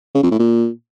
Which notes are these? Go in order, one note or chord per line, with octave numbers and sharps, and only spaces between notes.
C#3
F2
A2
A#2